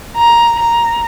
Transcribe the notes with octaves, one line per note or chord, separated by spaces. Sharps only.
A#5
A#5